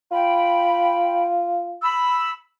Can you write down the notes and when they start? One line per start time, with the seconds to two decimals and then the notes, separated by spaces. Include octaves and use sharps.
0.11 F4 G5 B5
1.82 B5 E6